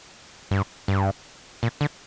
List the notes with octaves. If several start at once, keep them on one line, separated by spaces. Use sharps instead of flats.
G2
G2
A#2
D3